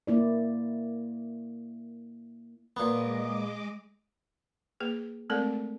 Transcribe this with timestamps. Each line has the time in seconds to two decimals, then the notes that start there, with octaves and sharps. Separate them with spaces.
0.07 A#3 E4 D5
2.77 A#2 G#3 B3 D#5 D6
4.80 A#3 G#4 B4
5.30 G#3 A3 C4 A4 A#4 D5